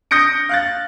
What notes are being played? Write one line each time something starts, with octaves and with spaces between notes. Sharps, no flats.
D#6 G6 A#6 C#7 D7
F5 F#6 A6